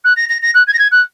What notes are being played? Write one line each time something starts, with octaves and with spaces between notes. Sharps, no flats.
F#6
A#6
A#6
A#6
F#6
G#6
A#6
G#6
F#6